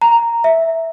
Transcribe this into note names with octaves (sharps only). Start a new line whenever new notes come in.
A#5
E5